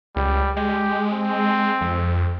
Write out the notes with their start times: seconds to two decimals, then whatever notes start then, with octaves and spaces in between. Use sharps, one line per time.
0.16 C#2 G3
0.57 G#3 G4
1.13 C4
1.81 F2